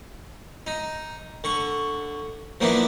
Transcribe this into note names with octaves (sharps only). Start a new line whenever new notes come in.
D#4
D3 C#6
F3 A#3 B3 D4 E4